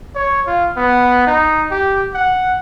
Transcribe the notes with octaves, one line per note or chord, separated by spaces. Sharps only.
C#5
F4
B3
D#4
G4
F#5